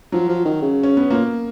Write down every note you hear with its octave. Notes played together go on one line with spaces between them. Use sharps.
F3 F#3
F3
D#3
C#3
C#4
B3
A#2 A#3